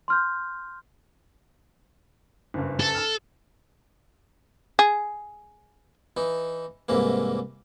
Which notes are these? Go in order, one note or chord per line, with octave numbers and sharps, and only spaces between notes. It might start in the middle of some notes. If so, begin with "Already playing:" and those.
C6 F6 G6
F#1 G2
A4
A5 F6
G#4
E3 D#4
C2 G#2 E3 A#3